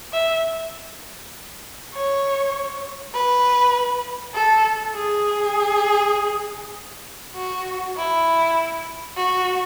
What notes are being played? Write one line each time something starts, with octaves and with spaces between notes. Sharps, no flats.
E5
C#5
B4
A4
G#4
F#4
E4
F#4